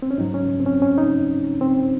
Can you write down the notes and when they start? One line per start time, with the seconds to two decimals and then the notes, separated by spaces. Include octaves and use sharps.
0.02 C4
0.11 C#4
0.18 G#2 F#3 D#4
0.34 C#4
0.60 C4
0.66 C#4
0.82 C#4
0.98 D#4
1.61 C4